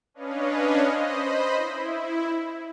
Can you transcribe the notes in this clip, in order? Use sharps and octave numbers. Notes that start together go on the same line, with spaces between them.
C#4 D4 B4 C#5 D#5 F5
C5 D#5 B5
E4